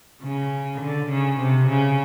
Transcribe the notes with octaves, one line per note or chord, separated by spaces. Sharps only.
C#3
D3
C#3
C3
C#3